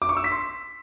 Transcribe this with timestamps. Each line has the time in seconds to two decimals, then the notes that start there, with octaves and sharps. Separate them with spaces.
0.02 D6
0.09 C#6
0.17 E6
0.24 B6
0.32 C6